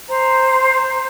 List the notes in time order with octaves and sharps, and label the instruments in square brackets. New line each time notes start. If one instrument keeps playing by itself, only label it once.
[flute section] C5 A#5